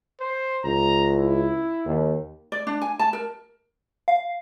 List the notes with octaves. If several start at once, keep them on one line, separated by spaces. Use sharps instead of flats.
C5
C#2 A#5
E4
D#2
D5
D4
G#5
A5
A#4
F5